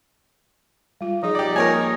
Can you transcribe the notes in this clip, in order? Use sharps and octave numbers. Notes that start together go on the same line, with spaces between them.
G3 F4
F3 D#4 G#4
G4 D5
A#3 F4 A#4 C#5 G#5